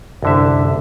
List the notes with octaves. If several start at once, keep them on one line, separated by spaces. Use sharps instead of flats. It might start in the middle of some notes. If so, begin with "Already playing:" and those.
C2 F#2 D3 E5